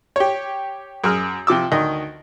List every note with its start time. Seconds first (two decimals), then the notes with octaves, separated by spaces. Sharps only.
0.16 G4 C#5
1.04 F#2 G#4 F6
1.47 C3 F3 D6 E6
1.72 D2 D#3 D#5